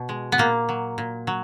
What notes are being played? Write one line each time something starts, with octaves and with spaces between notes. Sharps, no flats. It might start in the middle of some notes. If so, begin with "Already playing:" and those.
Already playing: B2
G#3
B3
A#2 A#3
F#3
A#2
F#3